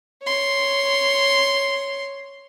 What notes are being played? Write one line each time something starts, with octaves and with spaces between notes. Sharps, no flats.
C#5 C6